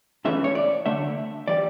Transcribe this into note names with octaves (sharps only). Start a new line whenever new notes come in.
C#2 C#3 E3 A3 E5
C#5
D5
D2 D3 A3 E5
E3 G3 D5